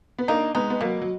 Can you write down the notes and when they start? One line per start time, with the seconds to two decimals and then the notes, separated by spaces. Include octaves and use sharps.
0.19 B3
0.28 A#3 D4 D#4
0.55 G#3 B3 D#4
0.70 B3
0.81 B2 F#3 A#3
1.02 F#3